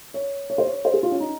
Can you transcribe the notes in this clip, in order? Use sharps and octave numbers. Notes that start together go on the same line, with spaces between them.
C#5
C#5
C5
C#5
C5
G#4
F4
C#4
D#4